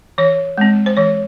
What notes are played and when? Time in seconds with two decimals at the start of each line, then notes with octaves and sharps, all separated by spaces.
0.18 E3 C#5
0.58 G#3 C4
0.86 C5
0.97 E3 C#5